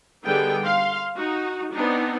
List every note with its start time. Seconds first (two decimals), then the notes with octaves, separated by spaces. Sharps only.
0.24 D3 G3 B3 D#4 G#4 G5
0.63 F5 C6
1.17 D#4 F#4
1.72 B3 C4 D4 D#4